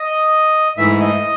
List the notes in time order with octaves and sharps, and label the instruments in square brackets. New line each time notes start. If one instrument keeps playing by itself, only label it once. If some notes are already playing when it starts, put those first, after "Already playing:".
Already playing: [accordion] D#5
G#2 E3 A3 E5
D#5